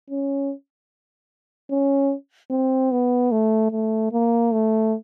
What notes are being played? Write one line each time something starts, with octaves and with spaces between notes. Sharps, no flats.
C#4
C#4
C4
B3
A3
A3
A#3
A3